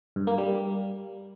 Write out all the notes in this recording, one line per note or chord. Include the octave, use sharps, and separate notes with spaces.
G2
A#3
G3